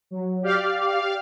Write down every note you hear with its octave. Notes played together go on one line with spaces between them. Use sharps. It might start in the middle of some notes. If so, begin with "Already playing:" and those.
F#3
G4 D5 F5